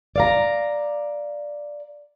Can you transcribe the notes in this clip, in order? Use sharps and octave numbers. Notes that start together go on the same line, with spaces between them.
D5 F5 A#5